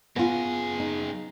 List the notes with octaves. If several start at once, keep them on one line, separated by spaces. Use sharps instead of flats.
F#2 B3 F4 G#4
D#4